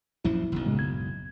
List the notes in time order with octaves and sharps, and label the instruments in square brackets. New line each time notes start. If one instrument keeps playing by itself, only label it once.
[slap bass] A#1 F#2 F3 [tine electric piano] E4
[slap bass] F#1 B1
[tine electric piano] A2 C#3 G#3
G#6